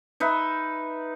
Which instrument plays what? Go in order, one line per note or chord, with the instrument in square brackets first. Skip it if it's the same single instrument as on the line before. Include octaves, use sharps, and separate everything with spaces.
[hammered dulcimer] D#4 B4 E5